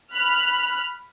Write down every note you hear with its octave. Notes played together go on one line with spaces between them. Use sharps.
B5 F6 F#6